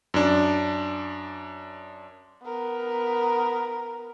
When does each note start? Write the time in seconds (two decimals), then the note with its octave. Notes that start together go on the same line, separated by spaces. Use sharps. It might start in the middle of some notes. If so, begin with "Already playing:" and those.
0.14 F#2 D4
2.44 B3 A#4